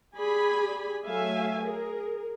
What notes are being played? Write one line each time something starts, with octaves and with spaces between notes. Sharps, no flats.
G4 G#4 D5 G#5 B5
F#3 A3 E5 F5 G#5
G#4 A#4